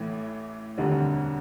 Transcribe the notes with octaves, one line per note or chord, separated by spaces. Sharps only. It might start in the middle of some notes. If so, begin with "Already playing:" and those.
Already playing: A1 A2 E3 A3
E1 D2 D3 G3 C4